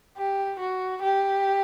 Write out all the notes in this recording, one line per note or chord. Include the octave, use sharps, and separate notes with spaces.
G4
F#4
G4